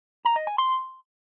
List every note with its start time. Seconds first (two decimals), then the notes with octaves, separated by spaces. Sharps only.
0.25 A#5
0.36 D#5
0.47 G#5
0.58 C6